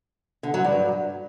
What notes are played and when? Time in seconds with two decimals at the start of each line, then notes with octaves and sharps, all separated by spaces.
0.43 D3
0.54 F#3
0.64 G2